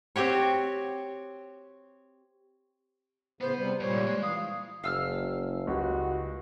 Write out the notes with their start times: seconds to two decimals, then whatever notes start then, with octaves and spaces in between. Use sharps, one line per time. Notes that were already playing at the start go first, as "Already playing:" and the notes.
0.16 C4 F#4 G4 C#5
3.41 A2 C#3 B3 B4 C5
3.57 C3 G3 C5
3.80 E2 A#2 G3 C5 C#5
3.93 G#2 D3
4.07 G#3
4.22 E3 F5 D#6
4.84 F#1 F5 E6 F6
5.67 C#2 F#4 G4